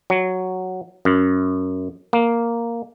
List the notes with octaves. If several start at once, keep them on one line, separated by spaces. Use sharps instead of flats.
F#3
F#2
A#3